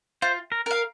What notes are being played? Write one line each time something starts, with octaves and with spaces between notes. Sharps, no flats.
F4 C5
A#4
A#4 F5